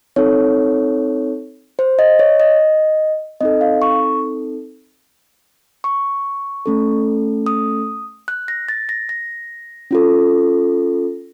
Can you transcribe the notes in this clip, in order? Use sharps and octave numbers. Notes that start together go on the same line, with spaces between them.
C4 D#4 A4 C#5
C5
D#5
C#5
D#5
C4 D#4 A4 D#5
F5
C#6
C#6
A3 C#4 A4
D#6
F#6
A#6
A6
A#6
A#6
C#4 F4 A4